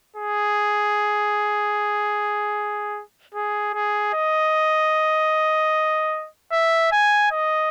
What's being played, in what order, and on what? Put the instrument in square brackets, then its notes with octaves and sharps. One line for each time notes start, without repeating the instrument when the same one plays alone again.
[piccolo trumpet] G#4
G#4
G#4
D#5
E5
G#5
D#5